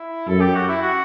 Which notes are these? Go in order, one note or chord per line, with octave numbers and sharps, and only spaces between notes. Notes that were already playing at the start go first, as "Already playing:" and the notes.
Already playing: E4
F#2 A4
G4
F#4
E4
F#4